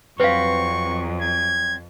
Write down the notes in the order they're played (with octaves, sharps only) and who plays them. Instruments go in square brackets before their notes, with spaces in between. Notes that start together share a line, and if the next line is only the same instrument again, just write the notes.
[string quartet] F2 [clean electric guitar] F#3 C4 [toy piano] B4 F5 [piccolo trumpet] C#6
[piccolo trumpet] G#6